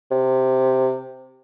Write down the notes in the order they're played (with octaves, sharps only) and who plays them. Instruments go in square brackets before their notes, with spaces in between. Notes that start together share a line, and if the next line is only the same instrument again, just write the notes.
[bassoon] C3